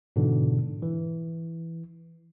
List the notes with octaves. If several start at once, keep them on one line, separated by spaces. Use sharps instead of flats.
G#2 B2 D3 E3
E3